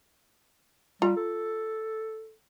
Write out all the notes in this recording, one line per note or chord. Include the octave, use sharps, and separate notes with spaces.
G3 F4 A#5
A4